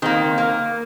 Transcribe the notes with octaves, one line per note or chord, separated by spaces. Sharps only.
D#3 A#3 C4
A#3